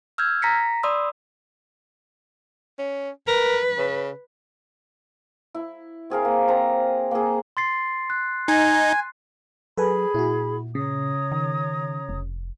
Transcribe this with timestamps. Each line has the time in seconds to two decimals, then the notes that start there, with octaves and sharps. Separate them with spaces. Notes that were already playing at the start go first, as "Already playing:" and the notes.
0.18 E6 F6 G6 G#6
0.42 A#5 A#6 B6 C#7
0.83 D5 B5 C6 D#6 E6
2.78 C#4
3.28 A#4 B4
3.78 C#3
5.54 E4
6.10 C4 G#4 A#4 F5
6.25 A#3
6.48 C4 A#5
7.11 A#3 G#4
7.57 C6 A6 C7
8.10 F#6
8.48 D#4 G#5
9.77 F#3 G#4 A4 B4 G#5 B5
10.14 A#2 E4 F#4
10.75 C#3 C#5 A#5 D#6
11.32 D#3
12.09 F1